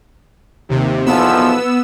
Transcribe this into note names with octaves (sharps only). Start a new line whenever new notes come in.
D#2 C3
B1 E2 F3 B3 E6